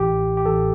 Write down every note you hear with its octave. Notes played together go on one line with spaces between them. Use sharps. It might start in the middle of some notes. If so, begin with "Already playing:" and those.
Already playing: A1 A2 E3 G4
G4
A1 A2 E3 A4